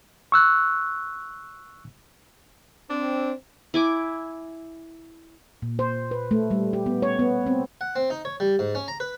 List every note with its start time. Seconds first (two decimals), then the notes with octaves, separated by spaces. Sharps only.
0.32 C#6 E6 F#6
2.90 C4 D4
3.74 E4 G#5 D6
5.62 A#2
5.79 C5
6.11 B4
6.31 A3
6.51 G3
6.73 G4
6.86 B3
7.02 C#5
7.19 B3
7.47 C4
7.81 F#5
7.96 C4
8.10 D#4
8.25 C#5
8.40 G3
8.59 G#2
8.75 C#4
8.88 A#5
9.00 B4